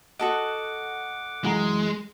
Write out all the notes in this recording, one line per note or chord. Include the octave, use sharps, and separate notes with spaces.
F#4 A4 D#5 F#5 D6
F#2 E3 G#3 A#5